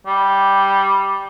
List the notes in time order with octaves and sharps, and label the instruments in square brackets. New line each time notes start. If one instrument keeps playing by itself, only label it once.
[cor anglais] G3